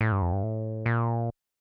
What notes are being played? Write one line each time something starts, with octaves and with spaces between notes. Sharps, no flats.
A2
G2
F2
G2
A2
A#2